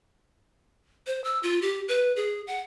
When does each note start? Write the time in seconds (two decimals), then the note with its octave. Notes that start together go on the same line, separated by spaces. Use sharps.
1.07 C5
1.24 E6
1.43 F4
1.62 G4
1.88 B4
2.16 G#4
2.47 F#5